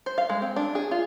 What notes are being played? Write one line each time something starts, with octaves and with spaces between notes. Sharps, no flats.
C5
F5
G#3
C4
D4
G#4
F4